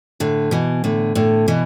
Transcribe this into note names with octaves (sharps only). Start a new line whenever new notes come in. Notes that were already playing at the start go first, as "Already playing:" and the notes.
A2 D3
B2 E3
A2 D3
A2 D3
B2 E3